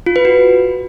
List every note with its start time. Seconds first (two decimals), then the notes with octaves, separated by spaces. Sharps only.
0.06 F4
0.16 B4
0.25 F#4